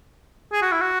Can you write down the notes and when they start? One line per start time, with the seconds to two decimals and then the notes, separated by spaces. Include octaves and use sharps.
0.53 G#4
0.62 F#4
0.72 E4
0.81 F#4